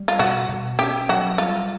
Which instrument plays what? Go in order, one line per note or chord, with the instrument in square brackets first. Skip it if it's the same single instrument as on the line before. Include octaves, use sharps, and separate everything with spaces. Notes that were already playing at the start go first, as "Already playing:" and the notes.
Already playing: [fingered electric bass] G3
[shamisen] F4
[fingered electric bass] B2 [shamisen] F#4
[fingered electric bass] B2
[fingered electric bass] C#4 [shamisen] G4
[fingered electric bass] F#3 [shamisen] F#4
[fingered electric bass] G3 [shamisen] F4